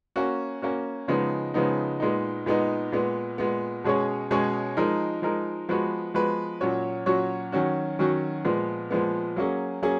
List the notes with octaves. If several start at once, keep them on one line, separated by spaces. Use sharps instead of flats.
A#3 C#4 F#4
A#3 C#4 F#4
C#3 F3 G#3 B3 D#4
C#3 F3 G#3 B3 D#4
A#2 G#3 B3 D#4
A#2 G#3 B3 D#4
A#2 G#3 B3
A#2 G#3 B3
B2 G#3 C#4 G#4 C#5
B2 G#3 C#4 G#4 C#5
F3 G#3 D#4 A#4
F3 G#3 D#4 A#4
F3 G#3 B3 F#4 B4
F3 G#3 B3 F#4 B4
A#2 F#3 C#4 F#4 C#5
A#2 F#3 C#4 F#4 C#5
D#3 F#3 C#4 F#4
D#3 F#3 C#4 F#4
A#2 F3 G#3 B3
A#2 F3 G#3 B3
F#3 A#3 C#4 G#4
F#3 A#3 C#4 G#4